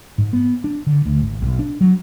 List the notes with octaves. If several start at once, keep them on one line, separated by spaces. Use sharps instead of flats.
G#2
B3
D4
D3
D2
G#1
B1
D4
F#3